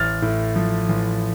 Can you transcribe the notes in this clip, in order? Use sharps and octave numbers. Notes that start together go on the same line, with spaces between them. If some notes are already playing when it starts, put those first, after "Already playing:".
Already playing: A1 F6 A6
A2
F3
A1